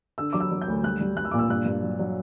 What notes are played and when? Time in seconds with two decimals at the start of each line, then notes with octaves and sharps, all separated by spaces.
0.18 D3 E6
0.33 F#3 D6
0.40 E6
0.51 F#3
0.61 G6
0.68 D2
0.83 G3 F#6
1.01 G3
1.16 G3 F#6
1.25 E6
1.31 A#2 D6
1.39 E6
1.49 G2 F#6
1.66 G2
1.83 F#3
1.99 F#3